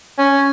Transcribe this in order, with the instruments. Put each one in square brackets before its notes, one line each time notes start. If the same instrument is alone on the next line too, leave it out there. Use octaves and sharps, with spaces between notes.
[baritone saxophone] C#4